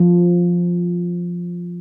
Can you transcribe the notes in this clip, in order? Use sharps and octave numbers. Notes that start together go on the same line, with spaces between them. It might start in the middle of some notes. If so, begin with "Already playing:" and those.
Already playing: F3